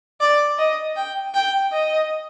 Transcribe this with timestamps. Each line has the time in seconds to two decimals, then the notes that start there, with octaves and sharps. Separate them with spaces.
0.21 D5
0.58 D#5
0.96 G5
1.34 G5
1.73 D#5